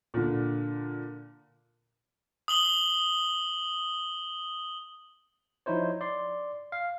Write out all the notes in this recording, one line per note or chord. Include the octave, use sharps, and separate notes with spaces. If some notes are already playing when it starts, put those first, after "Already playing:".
A#2 D3
D#6 F#7 G7
F3 D#4 E4 C5 C#5
D5 C6
F5